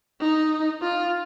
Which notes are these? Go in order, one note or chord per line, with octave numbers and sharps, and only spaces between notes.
D#4
F4